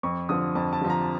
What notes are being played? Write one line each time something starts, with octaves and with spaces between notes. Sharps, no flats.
F2 C#6
D3 F3 D#6
F2 A5
A5
D3 F3
A#5